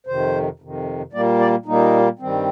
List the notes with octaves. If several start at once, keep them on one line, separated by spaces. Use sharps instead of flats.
F2 C3 D#3 C5
F2 C3 D#3
A#2 G3 A#3 D5
D5
A#2 G3 A#3 D#4
G2 D#3 G3 C4